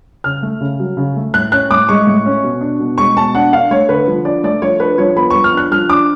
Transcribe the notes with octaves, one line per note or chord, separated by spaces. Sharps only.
C#3 F6
A3
C#3
F#3
C#3
A3
A2 F#6
C#4 F#6
A2 D6
G#3 C#6
A2
C#4
B2
D4
B2
G#3 C#6
B2 A5
D4 F#5
D4 F5
A3 C#5
D3 B4
F3
D4 D5
A3 D5
F3 C#5
D4 B4
F3 C#5
B3 B5
F3 C#6
F6
D4 F#6
F3 F6
D4 D6